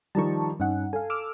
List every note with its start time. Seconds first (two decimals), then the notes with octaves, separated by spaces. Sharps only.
0.15 D#3 F3 G3 A5 A#5 C#6
0.60 G2 C#4 D#4 F#5
0.93 A4 F5 G#5
1.10 D6 E6 F6